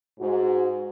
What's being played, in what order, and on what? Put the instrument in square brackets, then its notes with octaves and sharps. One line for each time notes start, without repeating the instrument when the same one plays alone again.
[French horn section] G#2 F#4